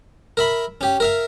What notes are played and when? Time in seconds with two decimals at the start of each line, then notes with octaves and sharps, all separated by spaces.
0.37 A#4 E5 B5
0.81 C#4 G4
1.00 A#4 E5 F5